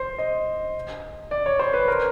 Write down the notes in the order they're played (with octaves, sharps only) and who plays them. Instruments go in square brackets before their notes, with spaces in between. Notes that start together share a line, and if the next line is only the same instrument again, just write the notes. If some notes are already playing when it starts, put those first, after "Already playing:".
Already playing: [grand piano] C5
D#5
D5
C#5
C5
B4
A#4